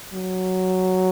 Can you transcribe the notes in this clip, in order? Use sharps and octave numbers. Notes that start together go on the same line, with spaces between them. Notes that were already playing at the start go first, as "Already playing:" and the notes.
F#3